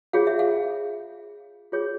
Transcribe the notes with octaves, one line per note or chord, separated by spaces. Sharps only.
F4 G#4 C#5 F5
E5
F5
F4 G#4 C#5